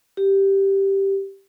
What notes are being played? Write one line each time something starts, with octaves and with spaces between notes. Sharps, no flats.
G4